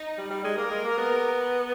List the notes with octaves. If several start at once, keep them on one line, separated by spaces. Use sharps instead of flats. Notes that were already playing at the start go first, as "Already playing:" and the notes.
Already playing: D#4
G3
G3
G#3
A#3 A#4
G#3
A#3
B3